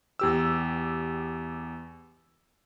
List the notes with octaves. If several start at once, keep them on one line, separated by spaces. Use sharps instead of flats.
E2 G4 E6